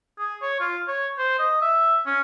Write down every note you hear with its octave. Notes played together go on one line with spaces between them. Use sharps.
G#4
C#5
F4
C#5
C5
D#5
E5
C#4